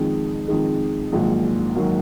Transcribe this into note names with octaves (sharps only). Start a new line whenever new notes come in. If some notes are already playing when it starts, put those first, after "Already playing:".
Already playing: F2 D#3 G#3
F2 D#3 G#3
A#1 G#2 D#3 F#3 A#3
D#3 F#3 A#3